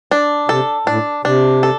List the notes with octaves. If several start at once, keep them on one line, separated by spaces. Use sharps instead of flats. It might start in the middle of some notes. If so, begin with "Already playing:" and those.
D4
C3 A4
A2 D4
C3 D4
A4